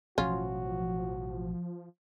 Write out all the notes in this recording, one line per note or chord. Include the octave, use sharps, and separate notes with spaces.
A1 B2 F3 F#3 C#4 F4 F#4